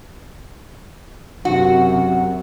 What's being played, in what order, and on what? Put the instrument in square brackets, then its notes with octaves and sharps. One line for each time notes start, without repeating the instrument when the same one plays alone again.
[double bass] F#2 C3 [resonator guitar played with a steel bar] F#4